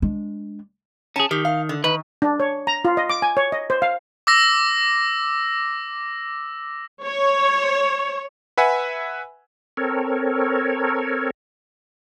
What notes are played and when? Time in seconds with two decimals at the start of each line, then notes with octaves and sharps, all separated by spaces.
0.02 G#3 D4
1.16 C#4 G#4 A5
1.31 D#3 G4
1.45 F5
1.69 D3
1.84 D#3 B4
2.22 D4
2.40 C#5
2.67 A#5
2.85 F4
2.97 D#5
3.10 D6
3.22 G#5
3.37 C#5
3.52 D#5
3.70 C5
3.82 F5
4.27 D6 E6 A#6
7.04 C#5
8.58 B4 E5 F#5 G#5
9.77 C4 A4 A#4 C#5